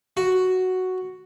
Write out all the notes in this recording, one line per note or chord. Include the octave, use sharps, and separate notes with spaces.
F#4